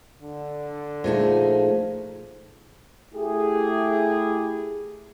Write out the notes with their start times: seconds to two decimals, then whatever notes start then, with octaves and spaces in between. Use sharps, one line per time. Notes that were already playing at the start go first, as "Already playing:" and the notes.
0.22 D3
1.04 A#2 F3 A3 D#4 G#4 A#4
3.15 A3 E4 G4 G#4